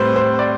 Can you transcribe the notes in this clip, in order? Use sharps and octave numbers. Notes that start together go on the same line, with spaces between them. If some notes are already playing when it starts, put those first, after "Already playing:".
Already playing: A2 G3 C4 B4 C5
C5
D5